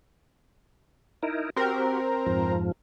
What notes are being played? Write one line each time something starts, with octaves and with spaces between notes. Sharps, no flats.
D#4 E4 A#4
C4 F#4 G4 A#4
F2 G#2 F3